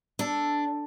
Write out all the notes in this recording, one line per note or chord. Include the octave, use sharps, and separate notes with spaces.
D4 A4